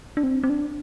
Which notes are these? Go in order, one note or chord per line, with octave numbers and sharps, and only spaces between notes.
D4
C4
C4
D4